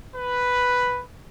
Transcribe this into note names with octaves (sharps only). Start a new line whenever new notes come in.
B4